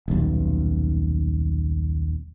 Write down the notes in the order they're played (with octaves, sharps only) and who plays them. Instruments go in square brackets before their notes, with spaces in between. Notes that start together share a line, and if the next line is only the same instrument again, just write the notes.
[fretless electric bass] D#1 B1